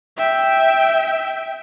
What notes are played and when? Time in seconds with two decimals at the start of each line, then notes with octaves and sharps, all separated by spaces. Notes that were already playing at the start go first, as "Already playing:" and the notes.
0.18 E5 G5